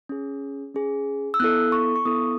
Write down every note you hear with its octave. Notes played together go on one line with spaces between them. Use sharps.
C#4 G#4
C#4 G#4
E6
B3 E4 A4 F#6
C#6
C#6
B3 E4 A4 D#6